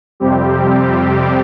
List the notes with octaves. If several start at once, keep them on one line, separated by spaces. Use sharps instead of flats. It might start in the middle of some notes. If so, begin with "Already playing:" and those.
F2 C3 G3 C4 G4